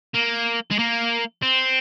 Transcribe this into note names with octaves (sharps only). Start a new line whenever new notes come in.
A#3
G#3
A#3
C4